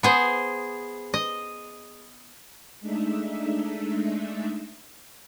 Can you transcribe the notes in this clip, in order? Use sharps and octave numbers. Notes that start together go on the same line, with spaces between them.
B3 G#4 C5
D#5
G#3 A3 D4 D#4 E5